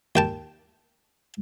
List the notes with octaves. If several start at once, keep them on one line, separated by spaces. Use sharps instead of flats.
D#2 G5 A5